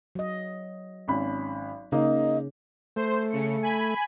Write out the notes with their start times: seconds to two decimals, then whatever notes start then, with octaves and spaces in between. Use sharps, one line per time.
0.15 F#3 D#5
1.08 G#1 C#4 B5
1.92 C#3 A#3 D#4 D#5
2.96 A3 C5
3.30 C#3 C#7
3.63 G#5 B5